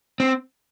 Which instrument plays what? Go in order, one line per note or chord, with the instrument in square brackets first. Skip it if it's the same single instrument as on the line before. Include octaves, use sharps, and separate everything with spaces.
[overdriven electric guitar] C4